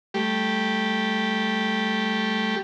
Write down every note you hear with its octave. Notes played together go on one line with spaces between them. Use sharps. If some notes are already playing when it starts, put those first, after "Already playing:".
G3 A3 G4